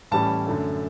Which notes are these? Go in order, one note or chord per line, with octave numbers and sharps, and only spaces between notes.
A2 E3 G3 C#4 A5
F#2 D3 A3